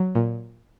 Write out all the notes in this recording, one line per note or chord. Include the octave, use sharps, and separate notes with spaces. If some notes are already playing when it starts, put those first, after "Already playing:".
Already playing: F#3
A#2